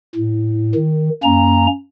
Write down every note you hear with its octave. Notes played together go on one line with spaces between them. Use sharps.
A2
D#3
F#2 A#3 C#4 A#5